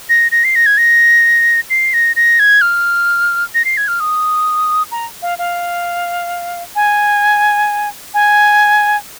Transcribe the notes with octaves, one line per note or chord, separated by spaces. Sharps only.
A#6
A#6
C7
A#6
G#6
A#6
C7
A#6
A#6
G#6
F6
A#6
C7
G#6
F6
D#6
A#5
F5
F5
G#5
G#5